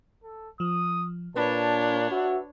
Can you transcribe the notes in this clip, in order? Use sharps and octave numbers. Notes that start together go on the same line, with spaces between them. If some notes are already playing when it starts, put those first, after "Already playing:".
A4
F3 D#6
A#2 D4 B4 C#5 A5 B5
F#4 E5